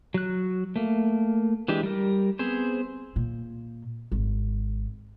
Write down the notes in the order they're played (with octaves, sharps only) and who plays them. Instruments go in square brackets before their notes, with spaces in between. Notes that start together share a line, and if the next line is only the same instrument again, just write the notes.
[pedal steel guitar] F#3 F#6
A3 A#3
E3 G#3 D4 G4
G3 A#4
B3 C4 G#4 C5
[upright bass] A#2
G#1